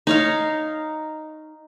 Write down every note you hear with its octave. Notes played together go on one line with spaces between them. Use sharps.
D#4 C#5 F5